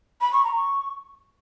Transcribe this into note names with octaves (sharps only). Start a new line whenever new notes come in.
B5
C#6
A#5
C#6